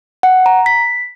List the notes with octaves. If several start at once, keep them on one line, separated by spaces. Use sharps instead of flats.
F#5
A#5
B6